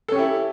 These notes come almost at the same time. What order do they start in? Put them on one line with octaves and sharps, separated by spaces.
A4 C#4 G4 E4